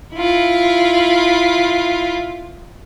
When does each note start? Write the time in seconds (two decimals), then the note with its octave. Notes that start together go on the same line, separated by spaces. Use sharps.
0.15 E4 F4